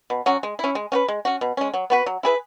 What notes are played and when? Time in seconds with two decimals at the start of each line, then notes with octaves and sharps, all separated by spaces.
0.10 B2
0.26 F#3 C#4 F#4
0.43 G#3
0.59 C#4 E4
0.75 G#3
0.92 C#4 F#4 B4
1.08 G#3
1.25 C#4 F#4
1.41 B2
1.57 G#3 C#4
1.74 F#3
1.90 B3 F#4 B4
2.06 F#3
2.23 E4 G#4 B4